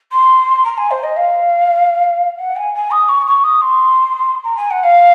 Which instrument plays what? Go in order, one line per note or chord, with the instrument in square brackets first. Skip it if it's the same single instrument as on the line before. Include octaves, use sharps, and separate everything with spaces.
[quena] C6
A#5
G#5
C5
D#5
F5
F#5
G#5
G#5
D#6
C#6
C#6
D#6
C6
A#5
G#5
F#5
F5